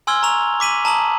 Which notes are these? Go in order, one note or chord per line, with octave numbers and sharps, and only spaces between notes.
G#5 C6 E6 F6 G#6 G7
A#5 C#6 F7
D6 B6 D#7 F#7
A5 A#5 D#6 F#7